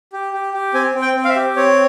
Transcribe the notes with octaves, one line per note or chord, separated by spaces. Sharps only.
G4
G4
G4
C4 G#5
C4
G5
C4
F5
E5
G4
C4 C#5